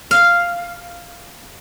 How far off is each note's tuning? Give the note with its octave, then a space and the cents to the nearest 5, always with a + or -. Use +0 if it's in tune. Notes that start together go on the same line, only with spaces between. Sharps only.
F5 -5